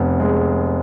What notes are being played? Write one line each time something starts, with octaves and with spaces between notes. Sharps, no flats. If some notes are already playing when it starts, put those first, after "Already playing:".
Already playing: F1 B3
G#3